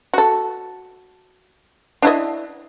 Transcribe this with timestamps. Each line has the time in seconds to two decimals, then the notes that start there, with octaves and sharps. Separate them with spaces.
0.14 F#4 A4
2.02 D4 E4 D#5